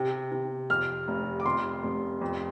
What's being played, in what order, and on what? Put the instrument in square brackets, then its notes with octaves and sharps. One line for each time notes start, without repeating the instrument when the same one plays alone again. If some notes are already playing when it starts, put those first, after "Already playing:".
Already playing: [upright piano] C3
C3
F2 F6
F1
D6
F2 C6
F1
F2